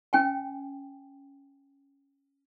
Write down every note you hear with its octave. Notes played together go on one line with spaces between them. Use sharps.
C#4 G5 G#5